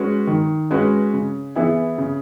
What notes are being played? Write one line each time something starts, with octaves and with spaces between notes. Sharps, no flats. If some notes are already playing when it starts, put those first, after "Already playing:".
Already playing: G#3 C#4 F#4 B4
D#3
G#3 C#4 F#4 B4
C#3
E3 B3 E4 G#4
C#3